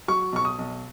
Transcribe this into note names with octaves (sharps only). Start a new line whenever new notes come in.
F#3 C#6
B1 C#6
D#6
B1